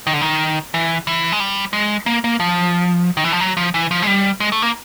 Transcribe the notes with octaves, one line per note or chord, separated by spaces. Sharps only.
D#3
D3
D#3
E3
E3
G#3
G3
G#3
A#3
A#3
F3
D#3
E3
F3
F#3
F3
E3
F3
G#3
G3
G#3
A3
A#3